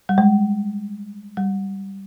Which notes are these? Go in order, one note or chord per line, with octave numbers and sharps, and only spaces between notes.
G3
G#3
G3